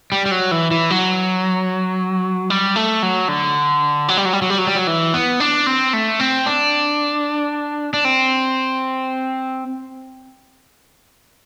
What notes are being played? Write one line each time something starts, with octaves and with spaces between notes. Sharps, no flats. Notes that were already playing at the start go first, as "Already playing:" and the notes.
G3
G3
F#3
E3
E3
F#3
G3
A3
F#3
D3
F#3
G3
F#3
G3
F#3
G3
F#3
G3
F#3
E3
B3
D4
C4
A3
C4
D4
D4
C4